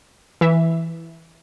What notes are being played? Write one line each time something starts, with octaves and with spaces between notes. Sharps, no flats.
E3 E5